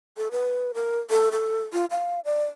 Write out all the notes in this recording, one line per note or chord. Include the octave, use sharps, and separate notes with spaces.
A4
B4
A#4
A4
A4
F4
F5
D5